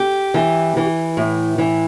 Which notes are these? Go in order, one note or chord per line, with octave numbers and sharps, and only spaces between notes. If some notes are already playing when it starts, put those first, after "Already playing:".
Already playing: G4
E3
E3
A2
E3